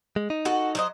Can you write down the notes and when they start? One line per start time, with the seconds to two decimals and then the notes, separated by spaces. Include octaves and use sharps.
0.16 G#3
0.30 D#4
0.45 F#4 A4
0.75 F#3 C5 D#5